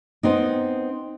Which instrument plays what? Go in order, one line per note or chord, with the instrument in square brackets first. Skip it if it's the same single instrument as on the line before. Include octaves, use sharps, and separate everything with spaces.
[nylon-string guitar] B3 C4 D#4